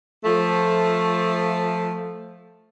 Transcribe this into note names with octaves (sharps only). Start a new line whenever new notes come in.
F3 A3